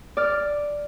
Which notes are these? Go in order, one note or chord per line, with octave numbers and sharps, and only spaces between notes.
D5 F6